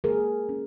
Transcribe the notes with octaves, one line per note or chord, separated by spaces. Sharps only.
A#3 G#4 A#4
C#4